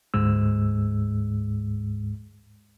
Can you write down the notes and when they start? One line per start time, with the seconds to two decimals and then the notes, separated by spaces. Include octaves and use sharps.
0.14 D2 G#2 G#3 E6